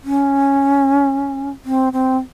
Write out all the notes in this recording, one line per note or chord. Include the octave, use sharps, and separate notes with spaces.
C#4
C4
C4